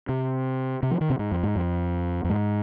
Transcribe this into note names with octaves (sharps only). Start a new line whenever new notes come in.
C3
C3
F3
D#3
C3
G#2
F2
G#2
F2
F2
G#2